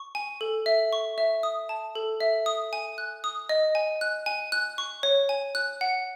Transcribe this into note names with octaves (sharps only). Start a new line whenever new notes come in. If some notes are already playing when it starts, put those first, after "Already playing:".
Already playing: C#6
G#5
A4
E5
C#6
E5
D#6
A5
A4
E5
D#6
G#5
F#6
D#6
D#5
G#5
F#6
G#5
F#6
C#6
C#5
G#5
F#6
F#5